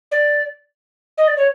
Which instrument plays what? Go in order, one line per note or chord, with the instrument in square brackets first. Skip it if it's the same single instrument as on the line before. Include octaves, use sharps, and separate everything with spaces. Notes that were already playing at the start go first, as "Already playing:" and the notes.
[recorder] D5
D#5
D5
C#5